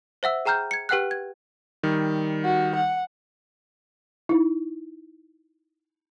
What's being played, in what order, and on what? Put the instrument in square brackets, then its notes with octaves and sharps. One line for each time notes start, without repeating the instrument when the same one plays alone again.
[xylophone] C5 E5 F#5 E6
G#4 G5 A#5 F6 G6
G#6 C#7
G4 B4 F#5 G5 F6 F#6
G#6
[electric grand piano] D#3 G3
[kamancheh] F#4
F#5
[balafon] D#4 E4